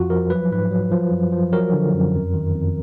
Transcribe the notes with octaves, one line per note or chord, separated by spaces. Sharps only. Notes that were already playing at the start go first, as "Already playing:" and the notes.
Already playing: F2 F3 F4 F#4
F3 A#4
F#3 B4
G#2 B4
F#3
F3
F#2
F3
F#3 A#4
D3
F#2
F2
D#3
F2